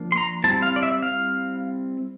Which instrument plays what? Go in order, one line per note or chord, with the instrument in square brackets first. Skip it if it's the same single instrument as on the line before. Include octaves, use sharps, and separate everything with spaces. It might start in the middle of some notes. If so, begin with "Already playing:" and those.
Already playing: [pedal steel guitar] F3 A#3 D4
C6
A#5
G3 C4 E4 A5
F5
D5
E5
F5